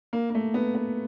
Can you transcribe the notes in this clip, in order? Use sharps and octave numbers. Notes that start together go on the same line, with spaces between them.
A#3
A#3
A3
B3
B3